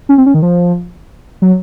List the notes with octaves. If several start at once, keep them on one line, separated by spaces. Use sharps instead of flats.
C#4
C4
C#4
D#3
F3
F#3